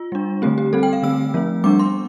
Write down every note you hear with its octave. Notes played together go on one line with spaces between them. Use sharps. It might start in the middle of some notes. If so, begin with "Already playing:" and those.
Already playing: F4
G3 D4
D3 A3 C4 G4
G4
G3 C4 A4
G5
F5
D3 A3 C4 E6
F3 A3 C4
G3 B3 D4 D6
C6